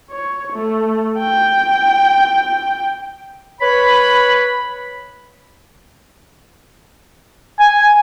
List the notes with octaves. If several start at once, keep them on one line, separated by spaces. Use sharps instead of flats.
C#5
A3
G5
B4 C#5 B5
G#5